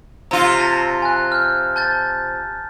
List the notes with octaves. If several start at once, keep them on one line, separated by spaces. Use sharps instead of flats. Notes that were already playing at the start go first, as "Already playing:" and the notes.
C3 F4 A#5 A#6 G7
A5 A6 A#6
G#5 F#6
F6 G6
A5 G6 A6